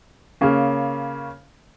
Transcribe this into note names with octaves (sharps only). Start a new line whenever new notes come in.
C#3 A#3 C#4